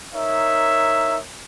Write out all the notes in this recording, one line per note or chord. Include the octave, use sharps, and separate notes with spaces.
D#4 A#4 C#5 E5